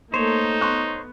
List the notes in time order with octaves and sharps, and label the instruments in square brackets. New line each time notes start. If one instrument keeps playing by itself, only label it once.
[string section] A3 A#3 [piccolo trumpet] D#4 [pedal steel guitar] C5 C#5
[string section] B3 [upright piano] C6 C#6 F#6